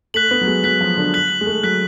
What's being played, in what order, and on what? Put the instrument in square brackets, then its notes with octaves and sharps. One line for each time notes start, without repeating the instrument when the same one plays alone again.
[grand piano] A3 [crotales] F#6 B6 F#7
[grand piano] B3
F#3
G#3
[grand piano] F#3 [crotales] F#6 B6 F#7
[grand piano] F3
D3
[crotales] F#6 B6 F#7
[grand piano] G#3
A3
[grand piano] F#3 [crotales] F#6 B6 F#7